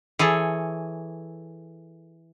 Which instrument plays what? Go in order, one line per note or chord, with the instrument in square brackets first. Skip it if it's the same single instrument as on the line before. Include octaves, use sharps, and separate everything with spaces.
[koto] E3 G#4 A4 C#5